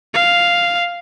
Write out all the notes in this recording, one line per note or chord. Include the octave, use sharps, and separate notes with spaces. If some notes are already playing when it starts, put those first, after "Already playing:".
F5